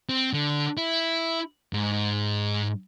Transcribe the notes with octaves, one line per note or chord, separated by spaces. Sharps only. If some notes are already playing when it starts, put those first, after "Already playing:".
C4
D3
E4
G#2